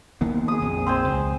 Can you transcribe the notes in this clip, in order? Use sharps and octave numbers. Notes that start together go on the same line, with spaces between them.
D#3 A#3 B3
G#4 D#6
A#1 F2
C4 C5 G#5
C#2